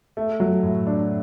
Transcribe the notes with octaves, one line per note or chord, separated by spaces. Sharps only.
A3
F#3
A2
D4